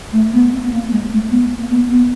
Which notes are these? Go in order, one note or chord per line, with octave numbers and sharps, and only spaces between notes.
A3
B3
C4
B3
A#3
G#3
A3
B3
A#3
B3
B3